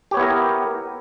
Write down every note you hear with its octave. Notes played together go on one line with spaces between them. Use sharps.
B3 E4 G4 A#4 C#5